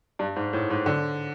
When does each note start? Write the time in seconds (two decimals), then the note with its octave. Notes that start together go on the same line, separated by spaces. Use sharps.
0.19 G2
0.36 G#2
0.53 A2
0.70 G#2
0.86 D3